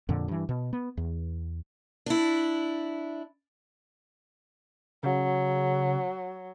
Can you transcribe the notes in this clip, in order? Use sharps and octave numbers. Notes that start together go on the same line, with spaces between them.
F2 A#2 D3
G2 E3
B2
B3
E2
D4 E4
C#3 F#3